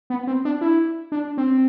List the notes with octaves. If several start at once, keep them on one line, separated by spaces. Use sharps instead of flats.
B3
C4
D4
E4
D4
C4